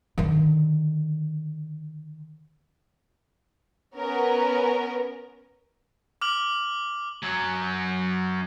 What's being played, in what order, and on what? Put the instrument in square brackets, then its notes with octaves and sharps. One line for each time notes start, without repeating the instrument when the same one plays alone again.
[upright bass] D3 D#3
[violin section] B3 C#4 A#4
[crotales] D6 F6 F#7
[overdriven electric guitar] F#2 F#3